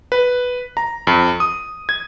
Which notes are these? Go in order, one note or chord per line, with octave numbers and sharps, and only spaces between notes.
B4
A#5
F2
D#6
G#6